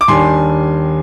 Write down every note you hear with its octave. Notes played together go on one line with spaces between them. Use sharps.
D6
D#2 D#3 G3 D4 G#5 C6